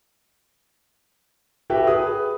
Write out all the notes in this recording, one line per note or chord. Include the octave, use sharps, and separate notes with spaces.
F#4 G4 A4 B4 E5 G5
G#4 B4 D#6